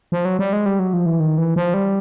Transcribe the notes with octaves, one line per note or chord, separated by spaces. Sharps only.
F3
F#3
G3
G#3
G3
F#3
F3
E3
D#3
E3
F3
G3